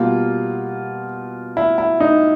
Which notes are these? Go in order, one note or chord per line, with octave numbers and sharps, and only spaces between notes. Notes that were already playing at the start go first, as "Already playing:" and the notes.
Already playing: B2 G3 A#3 F4
E4
E4
D#4